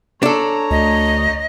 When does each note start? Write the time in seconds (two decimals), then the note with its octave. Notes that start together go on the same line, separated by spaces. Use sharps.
0.23 D4 A4 C#5 A#5
0.71 D2 D#5